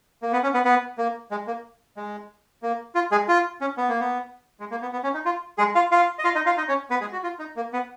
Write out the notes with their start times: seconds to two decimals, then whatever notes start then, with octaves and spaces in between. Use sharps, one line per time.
0.22 A#3
0.33 B3
0.43 C#4
0.54 B3
0.65 B3
0.98 A#3
1.31 G#3
1.47 A#3
1.97 G#3
2.62 A#3
2.95 F4
3.12 G#3 G#4
3.28 F4
3.61 C#4
3.77 B3
3.89 A#3
4.00 B3
4.60 G#3
4.71 A#3
4.82 B3
4.93 B3
5.04 C#4
5.14 D#4
5.25 F4
5.58 G#3 G#4
5.75 F4 F5
5.91 F4 F5
6.19 D#5
6.24 F4 F5
6.35 D#4 D#5
6.46 F4 F5
6.57 D#4 D#5
6.68 C#4 C#5
6.90 B3 B4
7.01 G#3 G#4
7.12 F#4
7.23 F4
7.39 D#4
7.56 A#3
7.73 B3